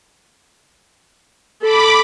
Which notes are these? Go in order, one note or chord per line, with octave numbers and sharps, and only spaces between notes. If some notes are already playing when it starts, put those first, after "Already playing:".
A4 B5 D6